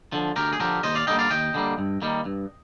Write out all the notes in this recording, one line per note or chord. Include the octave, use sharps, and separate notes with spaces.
D3 F3
D2 G4 A#4
G#4
D3 F3 G4 A#4
D#2 C5 D#5
D5 F5
D3 G3 A#3 D#5 G5
D5 F5
D#2 D#5 G5
D3 G3 A#3
G2
D#3 G3 A#3
G2